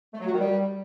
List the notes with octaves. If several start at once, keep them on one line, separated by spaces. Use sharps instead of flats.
A3
F#3
F#4
D#3
G3